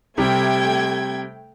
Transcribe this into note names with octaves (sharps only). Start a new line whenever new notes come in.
C3 G3 A3 G5 G#6